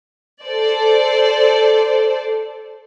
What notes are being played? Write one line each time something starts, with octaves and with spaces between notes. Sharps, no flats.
A4 C5 D5